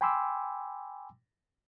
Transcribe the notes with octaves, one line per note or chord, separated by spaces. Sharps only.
G5 G#5 B5 C6 D6 E6